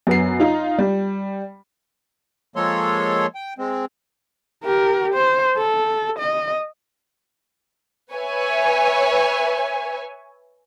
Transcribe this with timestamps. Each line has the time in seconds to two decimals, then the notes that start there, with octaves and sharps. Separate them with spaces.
0.07 F#2 B3 C7
0.40 D#4 F4
0.78 G3
2.56 F3 G#3 A#3 A4 C#5 C6
3.35 G5
3.58 G#3 C4
4.64 G4 A#4
5.14 C5
5.57 A4
6.18 D#5
8.12 B4 C#5 E5 G#5